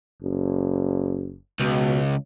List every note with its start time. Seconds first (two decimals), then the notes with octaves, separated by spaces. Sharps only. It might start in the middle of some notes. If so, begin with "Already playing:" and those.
0.23 F#1
1.60 C#2 B2